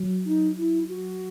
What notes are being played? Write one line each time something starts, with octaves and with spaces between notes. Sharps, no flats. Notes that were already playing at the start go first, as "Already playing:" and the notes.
Already playing: F#3
D#4
E4
F#4